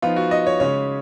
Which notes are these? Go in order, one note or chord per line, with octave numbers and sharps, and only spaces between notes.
F3 B3 D#4 F4
F#4
D#5
C#5
C#3 G#3 C#4 C#5